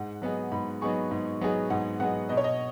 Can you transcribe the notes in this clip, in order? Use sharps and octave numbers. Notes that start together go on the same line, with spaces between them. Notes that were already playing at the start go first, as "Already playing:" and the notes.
Already playing: G#2 F#5
F#3 B3 D#4 G#4
G#2 B5
F#3 B3 D#4 G#4 C#6
G#2
F#3 B3 D#4 G#4
G#2 F#5
F#3 B3 D#4 G#4 F#5
B2 D#5
C#5
D#5